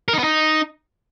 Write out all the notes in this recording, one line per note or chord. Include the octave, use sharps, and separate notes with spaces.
A#4
D#4
B3
D#4